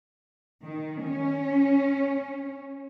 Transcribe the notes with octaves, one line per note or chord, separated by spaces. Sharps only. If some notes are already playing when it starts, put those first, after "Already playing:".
D#3
C#4